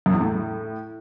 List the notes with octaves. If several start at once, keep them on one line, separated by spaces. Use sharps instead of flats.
F#2
E2
A2